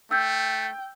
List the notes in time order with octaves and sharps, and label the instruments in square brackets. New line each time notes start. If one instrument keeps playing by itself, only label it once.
[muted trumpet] A3 [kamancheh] G5 [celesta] E6 G6